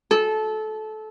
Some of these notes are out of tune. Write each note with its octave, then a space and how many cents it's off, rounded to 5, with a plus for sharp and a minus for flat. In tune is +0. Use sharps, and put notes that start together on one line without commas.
A4 -20